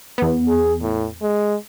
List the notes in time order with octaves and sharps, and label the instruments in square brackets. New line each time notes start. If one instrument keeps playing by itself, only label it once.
[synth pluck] E2 B3
[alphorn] G#4
A2
G#3